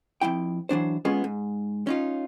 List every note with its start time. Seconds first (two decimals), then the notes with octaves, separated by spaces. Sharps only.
0.21 F2 E3 E4 G5
0.69 E3 F#3 D4 C5
1.05 G#3 B3 C#4 F4 G#4 D#5
1.24 G#2
1.87 C#4 D#4 F4